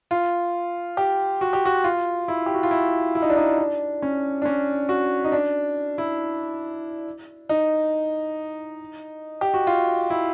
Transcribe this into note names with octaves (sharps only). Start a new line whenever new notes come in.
F4
G4
F#4
G4
F#4
F4
E4
G4
F#4
F4
E4
E4
D#4
D4
D#4
D4
C#4
D4
C#4
F#4
D#4
D4
E4
D#4
G4
F#4
F4
E4